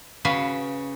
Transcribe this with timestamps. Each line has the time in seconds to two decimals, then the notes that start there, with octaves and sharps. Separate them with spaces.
0.25 C#3 F#4 B4 F5